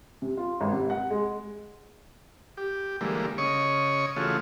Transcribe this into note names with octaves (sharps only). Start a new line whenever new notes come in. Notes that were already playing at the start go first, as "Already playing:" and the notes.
C3
F4
G#1
C3
F#5
G#3
G4
D3 E3 G3 G#3 A#3
C#3 C#5 D#5 C#6
C#3 E3 A3 F4 F#4 G#4